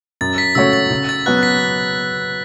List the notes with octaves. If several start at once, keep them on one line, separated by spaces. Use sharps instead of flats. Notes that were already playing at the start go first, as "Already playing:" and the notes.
F#2 A6
B6
C#3 A3 F#4 C#5 E6
A6
C#3
A6
F#3 B3 F#4 B4 F#6
B6